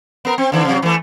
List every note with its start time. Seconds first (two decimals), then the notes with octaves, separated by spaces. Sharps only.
0.25 B3 A#4
0.38 C4
0.52 D3 D#3
0.65 C3 F#3
0.82 E3 A3